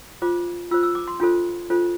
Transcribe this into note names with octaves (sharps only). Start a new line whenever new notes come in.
F4 C5 D6
F4 C5 E6
E6
D6
C6
D4 F4 A4 C5
D4 F4 A4 C5